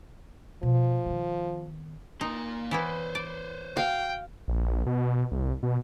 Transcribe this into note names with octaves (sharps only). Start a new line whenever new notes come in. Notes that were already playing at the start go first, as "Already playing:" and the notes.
B2 F3
D#3 B3
A#3 D#4 C6
E3 B3 E4 B4 C5
D5
F#4 F5 G5
A#1
B2
C2
B2